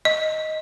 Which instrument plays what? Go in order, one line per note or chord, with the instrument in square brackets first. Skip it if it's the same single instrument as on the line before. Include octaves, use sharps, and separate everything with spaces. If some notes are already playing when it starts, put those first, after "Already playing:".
[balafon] D#5